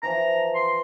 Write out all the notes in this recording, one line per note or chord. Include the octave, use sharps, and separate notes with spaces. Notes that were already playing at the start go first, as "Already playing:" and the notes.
E3 F3 A#5
C6